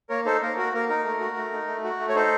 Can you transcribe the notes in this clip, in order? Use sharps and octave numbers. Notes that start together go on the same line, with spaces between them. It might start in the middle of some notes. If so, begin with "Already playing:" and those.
A#3 A#4 C#5
D#4 A4 C5
A#3 A#4
F#4 A#4
A#3 A#4
D#4 A#4
A3
F#4
A3
D#4
A3
F#4
A3
C#5
D#4 A4 C5